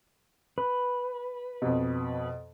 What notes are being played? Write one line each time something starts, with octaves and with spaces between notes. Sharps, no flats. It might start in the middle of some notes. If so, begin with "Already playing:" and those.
B4
F2 B2